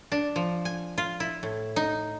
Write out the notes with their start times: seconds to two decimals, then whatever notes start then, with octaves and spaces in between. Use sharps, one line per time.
0.12 D4
0.36 F3
0.65 G#5
0.98 F4
1.20 E4
1.43 A2
1.76 D#4